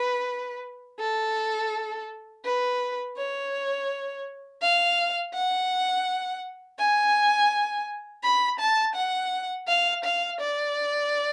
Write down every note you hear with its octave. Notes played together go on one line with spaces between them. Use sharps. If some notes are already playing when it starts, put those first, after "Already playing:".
Already playing: B4
A4
B4
C#5
F5
F#5
G#5
B5
A5
F#5
F5
F5
D5